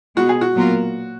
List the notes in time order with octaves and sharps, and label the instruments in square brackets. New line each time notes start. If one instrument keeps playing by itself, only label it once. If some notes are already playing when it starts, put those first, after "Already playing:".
[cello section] B2 G#3 B3 [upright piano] F#4
[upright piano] G#4
F#4
[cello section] A#2 F#3 B3 F4 A#4